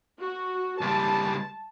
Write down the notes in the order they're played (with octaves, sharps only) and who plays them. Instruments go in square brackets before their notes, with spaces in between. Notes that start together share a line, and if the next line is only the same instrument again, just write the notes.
[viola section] F#4
[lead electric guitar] C#2 G3 [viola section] A5